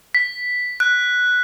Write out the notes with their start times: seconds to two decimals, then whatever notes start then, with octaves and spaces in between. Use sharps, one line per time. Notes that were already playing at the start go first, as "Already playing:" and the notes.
0.15 B6
0.80 F#6